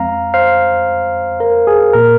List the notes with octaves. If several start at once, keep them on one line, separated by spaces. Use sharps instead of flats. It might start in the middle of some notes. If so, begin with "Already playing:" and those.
Already playing: F2 F3 G#3 C4 F5 A#5
C5 F5
A#4
G#4
A#2 A#3 A#4